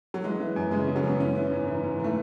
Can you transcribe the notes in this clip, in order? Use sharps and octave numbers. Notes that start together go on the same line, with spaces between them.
F#3
E3 G#3
E3
F#2
C#3 G#3
C#3
F#3
F#2 B3
E3 C#4
E3
G#2
E3
G#2
E3 A3